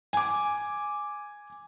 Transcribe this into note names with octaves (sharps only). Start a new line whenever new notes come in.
G#5 D6